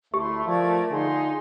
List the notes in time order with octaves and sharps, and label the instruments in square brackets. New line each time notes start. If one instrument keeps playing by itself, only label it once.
[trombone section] D2 E4 [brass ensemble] A3 [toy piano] G4 [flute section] C6
[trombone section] F3 [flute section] A#4 D5 G#6
[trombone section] D3 F4 G#4 [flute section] D#4 C6